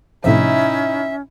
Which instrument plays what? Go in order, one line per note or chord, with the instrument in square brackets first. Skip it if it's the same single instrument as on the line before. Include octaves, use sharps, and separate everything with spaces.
[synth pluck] A2 C3 F3 [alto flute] C#4 [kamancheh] D#4 E4 [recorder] E5